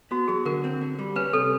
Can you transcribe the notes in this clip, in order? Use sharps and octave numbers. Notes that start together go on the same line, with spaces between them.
B3 F#4
F#3 G#4
D3 A#4
C4
D3
G3
C#4 B4
C3 A4